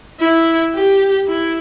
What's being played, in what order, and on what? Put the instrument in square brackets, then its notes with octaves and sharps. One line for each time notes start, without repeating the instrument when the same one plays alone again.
[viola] E4
G4
E4